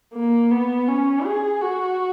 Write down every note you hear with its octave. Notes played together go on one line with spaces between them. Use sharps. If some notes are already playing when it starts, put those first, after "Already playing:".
A#3
B3
C#4
G#4
F#4